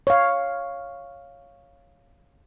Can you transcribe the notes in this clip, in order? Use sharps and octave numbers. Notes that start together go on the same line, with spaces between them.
C#5 F5